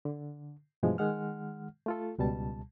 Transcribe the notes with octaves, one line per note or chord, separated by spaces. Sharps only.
D3
G2 B2 E3 F3 G#3
D#3 G#3 F#5 F6
A3 F4 A4
C#2 B2 G3 A5